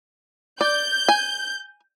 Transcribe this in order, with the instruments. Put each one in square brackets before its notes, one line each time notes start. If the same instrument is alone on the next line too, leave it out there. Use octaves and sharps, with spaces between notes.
[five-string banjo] D5 [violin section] G6
[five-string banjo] G#5